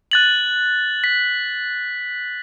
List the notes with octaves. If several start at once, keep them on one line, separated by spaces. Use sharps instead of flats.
F#6 A6 F#7
B6